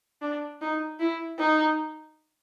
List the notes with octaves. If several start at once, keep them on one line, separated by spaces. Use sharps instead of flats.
D4
D#4
E4
D#4